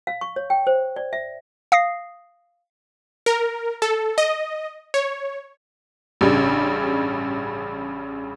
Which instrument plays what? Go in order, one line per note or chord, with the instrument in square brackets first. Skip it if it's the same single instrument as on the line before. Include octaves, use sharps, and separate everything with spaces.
[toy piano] F5
C#6
C#5
G5
C5
D5
E5
[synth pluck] F5 D#6 A#6 C7
[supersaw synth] A#4
A4
D#5
C#5
[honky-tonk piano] A1 G2 C#3 G3